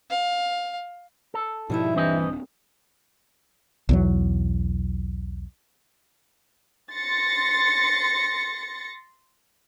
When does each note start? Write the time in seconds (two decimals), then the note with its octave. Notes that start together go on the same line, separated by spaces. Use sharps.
0.10 F5
1.34 A4
1.70 G#2 B2 F3 G3 D#4 E4 E5
1.95 D#1 G2 E3 C4 D4 C5 D#5
3.89 B1 E2 F#3
6.92 C6 A6 A#6 C#7